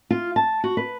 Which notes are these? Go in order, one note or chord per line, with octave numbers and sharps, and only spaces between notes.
F4
A5
F#4
B4